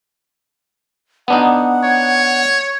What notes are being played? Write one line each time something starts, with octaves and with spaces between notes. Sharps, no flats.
B3 D4 D#4 F#5
C#5